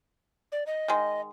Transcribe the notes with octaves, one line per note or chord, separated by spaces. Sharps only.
D5
D#5
D#3 G#3